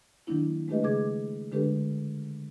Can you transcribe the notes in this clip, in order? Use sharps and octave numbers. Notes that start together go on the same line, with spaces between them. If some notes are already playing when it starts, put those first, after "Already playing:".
D#3 F#3 A#3 D4 E4
G#3 A3 D4 G4 B4 D#5
C#3 G#4 D6 G#6
D3 G#3 D4 G4 A4 B4